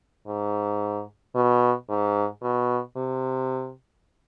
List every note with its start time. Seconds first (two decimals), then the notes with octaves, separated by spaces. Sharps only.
0.27 G#2
1.35 B2
1.89 G#2
2.42 B2
2.97 C3